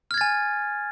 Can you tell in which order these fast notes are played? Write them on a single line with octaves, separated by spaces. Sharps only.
F6 G#6 A6 G#5